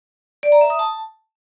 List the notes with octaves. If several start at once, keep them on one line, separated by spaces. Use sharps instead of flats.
D5
A#5
E5
D#6
A5